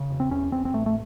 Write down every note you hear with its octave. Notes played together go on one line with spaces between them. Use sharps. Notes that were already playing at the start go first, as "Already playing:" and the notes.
Already playing: C#3
E1
C4
E2 C#4
E1 C4
C4
A1 A3
A3